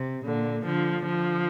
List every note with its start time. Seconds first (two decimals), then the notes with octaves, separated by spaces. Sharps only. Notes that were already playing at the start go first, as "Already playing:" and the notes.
Already playing: C3
0.24 A#2 D3
0.65 D3 F3
1.05 D3 F3